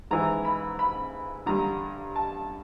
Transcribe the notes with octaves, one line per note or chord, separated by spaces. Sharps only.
G#2 E3 A#5
B5
B5
G2 D3 A#5
A5